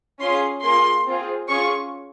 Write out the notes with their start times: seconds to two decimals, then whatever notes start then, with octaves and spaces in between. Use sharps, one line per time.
0.20 C#4 F4 G#4 C6
0.63 A#3 F4 G#4 C6
1.06 C4 F4 G#4
1.49 C#4 F4 G#4 C#6